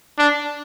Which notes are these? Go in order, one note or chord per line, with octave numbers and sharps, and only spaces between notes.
D4